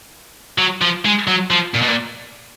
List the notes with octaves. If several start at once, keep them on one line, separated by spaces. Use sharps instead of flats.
F#3
F3
G#3
F#3
F3
A#2
B2
A#2